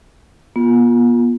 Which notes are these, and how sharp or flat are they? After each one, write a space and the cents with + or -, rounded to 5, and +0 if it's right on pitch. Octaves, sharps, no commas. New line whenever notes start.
B3 -45 F4 +5